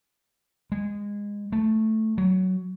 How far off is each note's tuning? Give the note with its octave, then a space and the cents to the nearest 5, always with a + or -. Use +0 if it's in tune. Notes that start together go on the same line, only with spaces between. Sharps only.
G#3 -20
A3 +0
F#3 +10